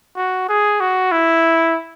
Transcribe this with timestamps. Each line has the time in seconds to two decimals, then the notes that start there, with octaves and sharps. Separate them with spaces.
0.17 F#4
0.49 G#4
0.80 F#4
1.11 E4